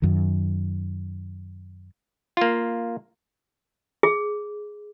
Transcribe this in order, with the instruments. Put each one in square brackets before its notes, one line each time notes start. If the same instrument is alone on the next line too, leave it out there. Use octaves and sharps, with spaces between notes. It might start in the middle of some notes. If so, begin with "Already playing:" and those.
[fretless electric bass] F#2 D#3
[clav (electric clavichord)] A#3 F4
[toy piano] G#4